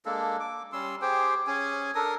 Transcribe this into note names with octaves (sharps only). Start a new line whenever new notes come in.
G#3 A#3 D4 A4
D6
G3 C#4 C6 E6
G4 G#4 C5 G5
C#4 G#4 G#5
D4 A4 A#4 D#6